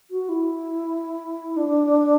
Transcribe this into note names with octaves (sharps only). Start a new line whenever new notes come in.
F#4
E4
D4